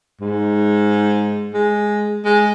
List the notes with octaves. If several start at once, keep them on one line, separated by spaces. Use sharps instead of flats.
G#2
G#3
G#3